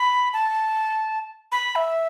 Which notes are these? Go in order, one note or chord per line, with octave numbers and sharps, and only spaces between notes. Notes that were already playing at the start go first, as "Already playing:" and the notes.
Already playing: B5
A5
B5
E5